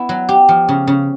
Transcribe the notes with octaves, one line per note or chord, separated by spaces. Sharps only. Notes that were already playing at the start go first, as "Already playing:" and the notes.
Already playing: B3 E4
F#3
G4
F3
C#3
C#3